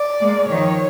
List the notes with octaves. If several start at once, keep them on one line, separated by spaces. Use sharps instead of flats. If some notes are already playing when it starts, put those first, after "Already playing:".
Already playing: D5
G#3 A#3
D#3 F3 C#5